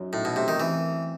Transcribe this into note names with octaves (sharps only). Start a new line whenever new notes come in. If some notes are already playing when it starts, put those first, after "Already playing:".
Already playing: F#2 F#3 D#4
A2 D#4
B2
C3 A3
D#3
E3 C4